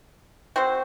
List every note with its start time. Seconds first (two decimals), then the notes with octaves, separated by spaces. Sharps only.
0.56 C4 F#4 C5